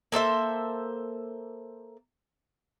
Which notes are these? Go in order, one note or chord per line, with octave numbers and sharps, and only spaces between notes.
A#3 A4 C5 E5